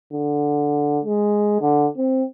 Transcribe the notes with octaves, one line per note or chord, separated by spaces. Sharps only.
D3
G#3
D3
C4